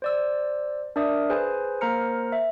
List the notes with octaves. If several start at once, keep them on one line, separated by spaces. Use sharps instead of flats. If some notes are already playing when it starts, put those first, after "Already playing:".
C5 D5 E6
D4 A#4 D5 E5 D#6
G#4 B4 C5 G#5
A#3 A#4 C5 A#5 F6 C#7
E5